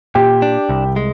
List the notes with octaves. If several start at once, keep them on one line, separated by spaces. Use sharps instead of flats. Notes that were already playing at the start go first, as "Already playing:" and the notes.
A#2 G4
D4
C2
G#3